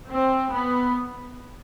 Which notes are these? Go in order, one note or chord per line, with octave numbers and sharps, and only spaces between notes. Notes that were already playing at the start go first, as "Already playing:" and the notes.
C4
B3